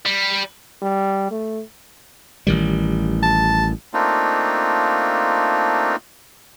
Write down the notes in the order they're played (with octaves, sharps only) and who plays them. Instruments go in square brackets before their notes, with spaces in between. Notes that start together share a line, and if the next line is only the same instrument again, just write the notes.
[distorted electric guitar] G3
[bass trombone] G3
A3
[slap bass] A1 D#3 G3
[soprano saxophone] A5
[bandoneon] A3 A#3 C4 D4 D#4 F4